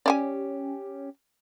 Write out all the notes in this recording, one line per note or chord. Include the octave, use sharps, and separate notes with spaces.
C#4 G4 D5 E5 G#5